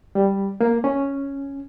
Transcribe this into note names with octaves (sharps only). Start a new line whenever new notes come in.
G3
A#3
C#4